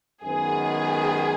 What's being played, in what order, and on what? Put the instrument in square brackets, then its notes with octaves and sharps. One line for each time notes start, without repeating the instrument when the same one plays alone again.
[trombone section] F#2 D#3 G#3 B3 [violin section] G#4